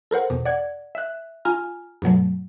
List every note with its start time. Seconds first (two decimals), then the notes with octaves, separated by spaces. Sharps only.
0.11 A4 A#4 C5 F#5
0.30 E2 B2
0.45 D5 F#5 G#6
0.95 E5 F#6
1.45 F4 G#5 A#5 F6
2.02 G2 B2 F#3 A3